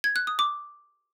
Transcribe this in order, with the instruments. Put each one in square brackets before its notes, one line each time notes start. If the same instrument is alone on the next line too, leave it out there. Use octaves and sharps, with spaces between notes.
[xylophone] G#6
F#6
D#6
D6